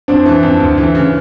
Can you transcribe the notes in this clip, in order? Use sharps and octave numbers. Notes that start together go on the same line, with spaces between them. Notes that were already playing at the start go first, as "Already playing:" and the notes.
F2 C4 D4
E3
F2
D2
E3
C#3